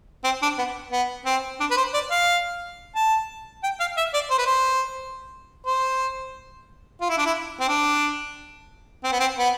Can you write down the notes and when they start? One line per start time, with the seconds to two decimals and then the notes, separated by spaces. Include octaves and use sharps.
0.24 C4
0.42 D4
0.58 B3
0.92 B3
1.26 C4
1.60 D4
1.71 B4
1.77 C5
1.94 D5
2.11 F5
2.96 A5
3.63 G5
3.80 F5
3.97 E5
4.14 D5
4.31 C5
4.38 B4
4.46 C5
5.66 C5
7.01 F4
7.10 E4
7.18 D4
7.26 E4
7.60 C4
7.68 D4
9.04 C4
9.12 B3
9.20 C4
9.39 B3